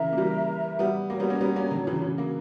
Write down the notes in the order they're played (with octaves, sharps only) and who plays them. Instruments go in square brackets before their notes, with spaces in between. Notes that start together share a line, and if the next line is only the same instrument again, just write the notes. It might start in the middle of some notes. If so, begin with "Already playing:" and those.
Already playing: [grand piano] C#3 E3 [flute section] A#4 E5 A#5
[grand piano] A#3
E3 G3
G3 B3
[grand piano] F#3 A#3 [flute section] F#4 C#5 G5 A#5
[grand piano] G3 B3
A#3 C#4
G3 B3
A#3 C#4
D3 F#3
C#3 E3
C#3 E3
F#3 A#3